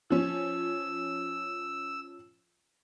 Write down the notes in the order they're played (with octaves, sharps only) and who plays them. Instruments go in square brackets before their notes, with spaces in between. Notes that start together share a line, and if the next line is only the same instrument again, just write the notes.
[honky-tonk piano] F3 C#4 [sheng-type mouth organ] E6